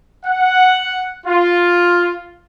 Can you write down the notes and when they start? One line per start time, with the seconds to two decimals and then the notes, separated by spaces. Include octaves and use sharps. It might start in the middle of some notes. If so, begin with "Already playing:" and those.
0.24 F#5
1.26 F4